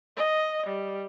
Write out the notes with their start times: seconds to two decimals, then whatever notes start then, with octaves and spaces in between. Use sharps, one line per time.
0.17 D#5
0.67 G3